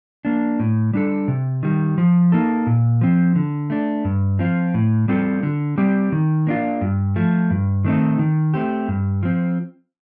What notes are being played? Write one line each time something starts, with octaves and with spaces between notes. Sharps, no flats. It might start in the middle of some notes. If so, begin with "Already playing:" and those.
A#3 D4
A2
G3 D4 A4
C3
D#3 G3
F3
A#3 D#4 A4
A#2
F3 C4
D3
A3 D4
G2
F3 C4 F4
A2
G3 C4 F4 A4
D3
G3 C4 G4
D#3
A#3 D4 F4
G2
F3 A3
G2
D#3 A3 C4 D#4
D#3
A3 C4 G4
G2
F3 C4